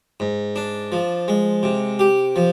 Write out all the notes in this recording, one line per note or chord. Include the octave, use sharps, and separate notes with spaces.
G#2
D4
F3
G#3
C3
G4
F3